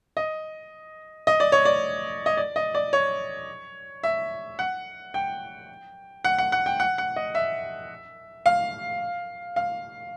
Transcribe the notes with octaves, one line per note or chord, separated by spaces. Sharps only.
D#5
D#5
D5
C#5
D5
D#5
D5
D#5
D5
C#5
E5
F#5
G5
F#5
F#5
F#5
G5
F#5
F#5
D#5
E5
F5
F5